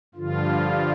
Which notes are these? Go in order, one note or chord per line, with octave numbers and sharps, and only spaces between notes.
G2 D3 F3 F4